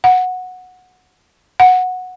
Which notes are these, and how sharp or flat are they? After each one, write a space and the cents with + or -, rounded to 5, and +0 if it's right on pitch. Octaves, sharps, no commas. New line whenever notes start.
F#5 -10
F#5 -10